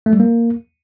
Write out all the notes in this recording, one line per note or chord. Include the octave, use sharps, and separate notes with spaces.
A3
G3
A#3